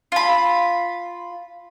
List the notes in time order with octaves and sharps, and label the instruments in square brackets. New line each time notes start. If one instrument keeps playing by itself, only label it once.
[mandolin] F4 B5